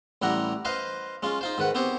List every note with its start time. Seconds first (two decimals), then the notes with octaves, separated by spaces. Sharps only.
0.22 A1 G3 E4 F#5 A#5
0.65 B4 C5 D#5 F5
1.23 G#3 C#4 F4
1.41 D#4 F4 C5
1.58 G#2 D#3 B4 F#5
1.75 B3 C4 G4 C5 C#5